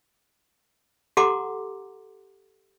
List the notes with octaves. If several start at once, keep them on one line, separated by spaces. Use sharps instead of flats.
G4 A4 F#5 A#5 C6 D6